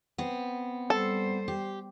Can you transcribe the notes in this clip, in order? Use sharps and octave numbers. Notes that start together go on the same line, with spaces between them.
B3 C4
G3 A4 C5
G4